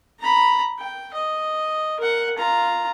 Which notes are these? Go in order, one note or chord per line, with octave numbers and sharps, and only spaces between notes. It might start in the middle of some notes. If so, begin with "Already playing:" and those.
A#5 B5
G5
D#5
A#4 F#5
F4 A#5